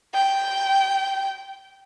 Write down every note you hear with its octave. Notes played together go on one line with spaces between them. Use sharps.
G5